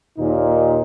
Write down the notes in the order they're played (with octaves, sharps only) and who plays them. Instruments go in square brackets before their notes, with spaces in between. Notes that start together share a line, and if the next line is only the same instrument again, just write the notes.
[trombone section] D#2 A#2 D#4